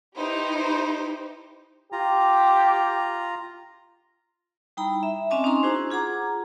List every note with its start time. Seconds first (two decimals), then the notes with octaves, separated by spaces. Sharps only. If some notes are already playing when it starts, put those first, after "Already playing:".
0.16 D#4 E4 G4 B4 C5
1.92 F4 G4 A#5
4.77 G3 D#4 E4 G5 A#5 B5
5.03 E5
5.31 C4 C#4 D#5 G#5 A5 D6
5.44 C#4 D#4 A#5 C6
5.63 D4 E4 F#4 G#4 C5
5.90 F4 G#4 F#5 A#5 D6